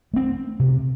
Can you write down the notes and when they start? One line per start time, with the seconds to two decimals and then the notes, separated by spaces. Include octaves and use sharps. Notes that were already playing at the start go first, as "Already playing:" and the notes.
0.14 A3 C4
0.60 C3